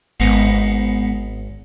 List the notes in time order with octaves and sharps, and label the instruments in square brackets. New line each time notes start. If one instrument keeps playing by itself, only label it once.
[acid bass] G#1 [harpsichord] G#2 B3 D#4